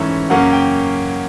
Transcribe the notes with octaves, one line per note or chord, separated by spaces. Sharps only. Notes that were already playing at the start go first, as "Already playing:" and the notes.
Already playing: G#2 E3 A3 C#4 E5
F#2 C#3 F#3 A#3 C#4 F#5
G5